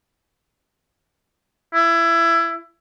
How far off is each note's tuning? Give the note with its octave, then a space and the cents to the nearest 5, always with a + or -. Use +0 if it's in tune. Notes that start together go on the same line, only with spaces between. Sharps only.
E4 +20